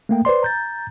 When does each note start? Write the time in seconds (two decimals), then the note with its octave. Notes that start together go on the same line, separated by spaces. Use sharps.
0.09 A3 A#3 G5
0.25 B4 C5 D5 C6
0.43 A#5 G6 A6